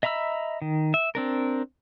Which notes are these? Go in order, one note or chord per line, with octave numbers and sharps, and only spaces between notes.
D#5 E5 A#5 B5 E6
D#3
E5
C4 D4 A#4